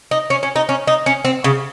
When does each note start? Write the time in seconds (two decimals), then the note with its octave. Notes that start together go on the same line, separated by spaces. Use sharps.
0.11 D#4
0.30 C#4
0.43 C#4
0.56 D#4
0.69 C#4
0.87 D#4
1.06 C#4
1.25 C4
1.44 C#3